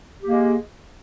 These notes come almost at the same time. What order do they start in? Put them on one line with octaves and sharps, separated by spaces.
G4 A#3 G#3